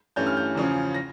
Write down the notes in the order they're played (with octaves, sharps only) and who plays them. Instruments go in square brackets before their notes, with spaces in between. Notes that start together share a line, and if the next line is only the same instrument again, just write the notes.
[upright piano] G2 E3 A3 C#4 G6
F6
G6
E2 C#3 F3 C#4
A#6